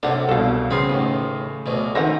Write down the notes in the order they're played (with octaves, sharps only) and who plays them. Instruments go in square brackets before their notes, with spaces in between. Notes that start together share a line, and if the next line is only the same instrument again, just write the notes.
[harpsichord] C3 F#3 A#3 [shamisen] D4 F#5 [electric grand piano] A4
[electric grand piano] C2 B2 [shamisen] A4 F5
[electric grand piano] C#3 C6 C7 [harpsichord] B3 C4 B5
[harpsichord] A1 D#2
D2 B2 F#3
[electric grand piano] D#3 A#6 [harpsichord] E3 [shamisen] C4 C#4 F#5